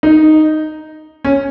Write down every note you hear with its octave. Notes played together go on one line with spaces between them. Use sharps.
D#4
C#4